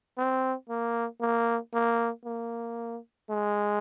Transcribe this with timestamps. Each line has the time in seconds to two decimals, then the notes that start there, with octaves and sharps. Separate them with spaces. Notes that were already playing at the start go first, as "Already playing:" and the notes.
0.18 C4
0.70 A#3
1.21 A#3
1.74 A#3
2.26 A#3
3.30 G#3